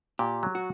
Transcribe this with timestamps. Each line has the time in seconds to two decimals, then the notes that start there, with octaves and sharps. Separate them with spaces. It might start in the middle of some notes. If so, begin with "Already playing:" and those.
0.19 A#2 G4
0.43 F#3
0.55 F#4